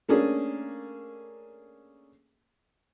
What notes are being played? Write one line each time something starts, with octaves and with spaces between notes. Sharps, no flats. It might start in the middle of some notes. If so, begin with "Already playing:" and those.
A3 A#3 C#4 D4 G#4